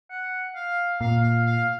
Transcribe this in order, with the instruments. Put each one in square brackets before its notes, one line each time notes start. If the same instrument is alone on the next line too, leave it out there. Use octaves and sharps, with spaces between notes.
[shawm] F#5
F5
[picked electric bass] A#2 [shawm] F5
[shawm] F5
F5